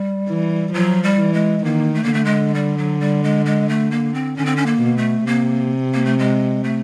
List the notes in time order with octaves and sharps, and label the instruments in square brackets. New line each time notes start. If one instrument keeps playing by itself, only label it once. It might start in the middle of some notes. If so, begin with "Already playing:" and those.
Already playing: [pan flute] G3
[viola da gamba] E3
[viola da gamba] F3 [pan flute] F#3
[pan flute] G3
[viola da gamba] E3
[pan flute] G#3
[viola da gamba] D#3 [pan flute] A#3
[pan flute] A3
A#3
[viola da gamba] D3 [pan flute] A3
[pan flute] G#3
G3
F#3
G3
G#3
G#3
A3
A#3
C4
[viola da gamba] D3 [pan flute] C#4
[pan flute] C4
C#4
A#3
[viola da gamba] B2
[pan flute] A3
[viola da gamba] C3 [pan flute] A#3
[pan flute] A#3
A3
G#3
A3